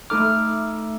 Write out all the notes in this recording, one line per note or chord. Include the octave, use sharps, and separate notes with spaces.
A3 D#4 A4 D6 F6